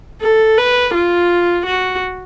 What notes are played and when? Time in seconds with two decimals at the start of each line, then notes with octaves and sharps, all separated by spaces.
0.21 A4
0.57 B4
0.94 F4
1.66 F#4